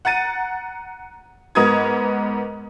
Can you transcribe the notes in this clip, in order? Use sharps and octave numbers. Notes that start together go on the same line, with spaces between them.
F#5 A#5 A6 D#7
G#2 B3 A#4 D#5 D#6 G#6